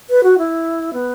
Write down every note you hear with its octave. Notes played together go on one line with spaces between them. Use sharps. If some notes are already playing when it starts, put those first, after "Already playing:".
B4
F#4
E4
B3